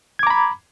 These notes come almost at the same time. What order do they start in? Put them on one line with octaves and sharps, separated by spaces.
G#6 D6 A#5 B5